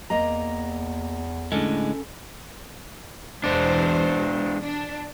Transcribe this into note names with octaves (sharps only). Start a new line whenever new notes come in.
E2 A#3 D#5 A#5
A2 D3 G#3 C#4 A4
E2 B2 G#3 D4 C5
D4